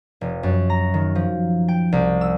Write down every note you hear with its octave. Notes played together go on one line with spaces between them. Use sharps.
F1
F#2
A#5
D#3
F3
G5
C2
E6